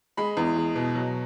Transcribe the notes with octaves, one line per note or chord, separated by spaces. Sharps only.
G#3 B5
E2
G#3
B2
F#3